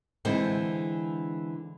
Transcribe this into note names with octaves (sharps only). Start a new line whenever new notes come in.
D3 E3 G#3 C4